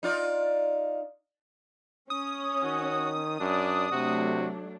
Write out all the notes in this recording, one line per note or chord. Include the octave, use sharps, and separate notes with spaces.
D#4 F4 D5
C#4 D#6
D#3 F#4
F#2 D4 D5
C3 F#3 A3 D4 F#4